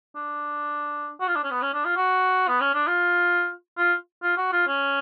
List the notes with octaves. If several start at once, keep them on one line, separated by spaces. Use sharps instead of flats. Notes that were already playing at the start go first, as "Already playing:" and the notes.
D4
F#4
F4
D4
C#4
B3
C#4
D4
F4
F#4
B3
C#4
D4
F4
F4
F4
F#4
F4
C#4